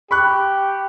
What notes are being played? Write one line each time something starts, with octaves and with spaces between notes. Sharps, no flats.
G4 B5 C#6 F#6